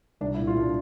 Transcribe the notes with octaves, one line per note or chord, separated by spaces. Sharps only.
C2 D4
E4
A#2
F4
C2 D4